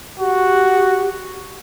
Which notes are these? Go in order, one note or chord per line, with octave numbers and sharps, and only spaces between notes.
F#4 G4